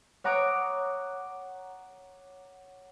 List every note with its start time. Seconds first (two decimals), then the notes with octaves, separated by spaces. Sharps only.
0.24 C#5 F#5 A#5 D6 D#6